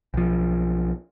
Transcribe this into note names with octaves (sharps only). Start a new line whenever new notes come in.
B1 F3